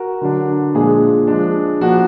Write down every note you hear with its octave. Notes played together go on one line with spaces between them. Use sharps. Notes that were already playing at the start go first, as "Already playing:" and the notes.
Already playing: F#4 A#4
D3 F#3 D4
A#2 F3 G#3 D4 G#4
F3 G#3 D4
F3 A#3 D4 F#4